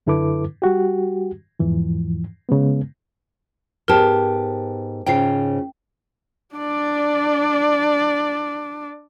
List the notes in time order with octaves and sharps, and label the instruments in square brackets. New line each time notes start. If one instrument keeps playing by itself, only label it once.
[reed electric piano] F#2 D3 E4 A4 B4 D6
G3 F#4 G4
E2 G#2 E3 F3
C#3 G#3 B3
[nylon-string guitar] G#2 B3 G4 [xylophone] A#4 A5
[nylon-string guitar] G#2 C#3 F4 [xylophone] G5 C7
[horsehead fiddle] D4 D5